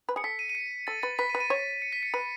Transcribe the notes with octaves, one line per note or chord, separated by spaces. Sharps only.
B4
G#4 C#7
A4 B6
D#7
D#7
C#7
A4 A6
B4 A6
B4 B6
D#7
B4
D#7
C#5
C#7
B6
C#7
B4 D#7